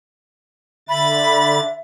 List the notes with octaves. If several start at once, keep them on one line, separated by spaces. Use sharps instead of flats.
D3 E5 B5 A6